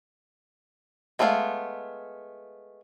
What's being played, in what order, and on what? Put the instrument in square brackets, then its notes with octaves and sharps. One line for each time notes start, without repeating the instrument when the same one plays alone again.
[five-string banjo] G#3 A3 B3 D4 F4